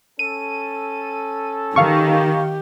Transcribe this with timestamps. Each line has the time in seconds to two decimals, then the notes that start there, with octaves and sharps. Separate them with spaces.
0.19 C#4 A4 D#7
1.76 D#3 G4 F5 C#6